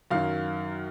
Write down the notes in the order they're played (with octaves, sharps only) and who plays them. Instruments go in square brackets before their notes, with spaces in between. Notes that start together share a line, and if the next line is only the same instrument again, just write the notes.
[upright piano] F#2 D#3 F#3 F5